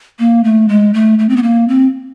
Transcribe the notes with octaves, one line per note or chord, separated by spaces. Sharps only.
A#3
A3
G#3
A3
A3
C4
B3
A#3
C4